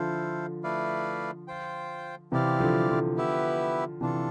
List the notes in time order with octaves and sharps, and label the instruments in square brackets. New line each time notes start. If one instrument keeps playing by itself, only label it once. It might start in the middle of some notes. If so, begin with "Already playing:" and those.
Already playing: [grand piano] D3 F3 [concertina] E4 A4 C5 F5
[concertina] A3 E4 B4 D5 F5
F4 C5 G5
[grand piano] C3 E3 [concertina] C4 E4 G4 D5 F5
[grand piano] D3 F3
D3 F3
[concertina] B3 E4 G4 B4 E5
[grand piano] C3 E3 [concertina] D4 F4 A4